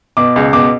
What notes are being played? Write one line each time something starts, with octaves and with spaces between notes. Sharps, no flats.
B2 D6
C#2
B2 D6